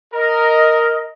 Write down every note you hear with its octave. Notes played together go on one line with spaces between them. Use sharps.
A#4 D#5